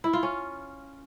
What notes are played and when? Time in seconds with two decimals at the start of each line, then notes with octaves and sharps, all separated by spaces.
0.04 E4
0.13 F4
0.23 C#4